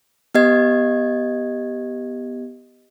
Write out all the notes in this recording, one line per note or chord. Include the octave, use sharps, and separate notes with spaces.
B3 G4 D#5 G#6